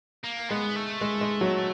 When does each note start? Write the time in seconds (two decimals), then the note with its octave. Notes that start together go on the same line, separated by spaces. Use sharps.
0.24 A#3
0.50 G#3 B3
0.76 A3
1.01 G#3
1.21 G#3
1.41 F#3